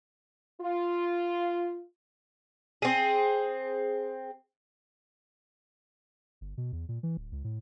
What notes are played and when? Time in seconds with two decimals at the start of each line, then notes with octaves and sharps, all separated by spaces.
0.61 F4
2.82 C4 G#4
6.41 G1
6.58 B2
6.72 E2
6.89 A#2
7.03 E3
7.17 D1
7.32 C#2
7.44 A2